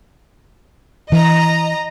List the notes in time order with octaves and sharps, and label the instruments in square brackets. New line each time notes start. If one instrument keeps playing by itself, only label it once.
[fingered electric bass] E3 [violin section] D#5 A#5